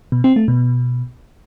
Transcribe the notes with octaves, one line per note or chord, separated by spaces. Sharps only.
B2
C4
A3
B2